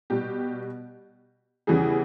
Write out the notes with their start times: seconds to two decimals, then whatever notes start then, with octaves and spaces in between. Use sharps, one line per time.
0.10 B2 G3 G4
1.67 E2 C#3 E3 G3 G#4